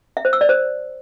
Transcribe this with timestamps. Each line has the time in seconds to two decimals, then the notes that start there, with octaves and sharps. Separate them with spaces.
0.17 E5
0.25 C5
0.33 E6
0.41 D5
0.49 C5